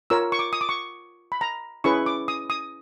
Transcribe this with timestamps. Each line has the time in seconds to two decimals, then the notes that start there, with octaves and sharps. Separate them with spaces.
0.10 F4 A#4 C#5 E6
0.32 C#6
0.39 D6
0.53 D#6
0.61 D6
0.69 C#6
1.32 B5
1.41 A#5
1.84 C#4 E4 G#4 B4 C#6
2.06 D6
2.28 D#6
2.50 D#6